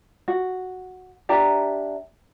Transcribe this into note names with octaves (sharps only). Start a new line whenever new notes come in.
F#4
D4 G4 E5 A#5